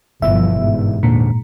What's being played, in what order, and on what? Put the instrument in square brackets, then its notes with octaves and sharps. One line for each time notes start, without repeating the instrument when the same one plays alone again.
[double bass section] G1 F3 [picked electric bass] G2 B2 E3 [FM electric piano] E5
[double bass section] G#2
[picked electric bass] E2 D3 [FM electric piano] A#2